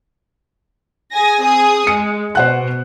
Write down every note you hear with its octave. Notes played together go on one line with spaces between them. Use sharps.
G#4 G#5 A#6
C4 G#4 D#6
G#3 C#7
B2 C5 F#5 F#6